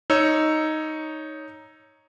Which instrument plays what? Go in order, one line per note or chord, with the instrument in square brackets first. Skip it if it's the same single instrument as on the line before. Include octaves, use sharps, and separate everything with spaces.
[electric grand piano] D#4 C#5 E6